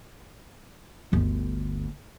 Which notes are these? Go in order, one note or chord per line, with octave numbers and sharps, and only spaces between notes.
G1 D2